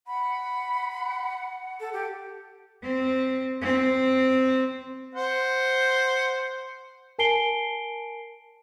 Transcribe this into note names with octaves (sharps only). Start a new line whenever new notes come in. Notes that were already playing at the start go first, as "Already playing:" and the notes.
F#5 B5
A4
G4
C4
C4
C5 F#5
A#4 G#5 A5 C7 D7 G7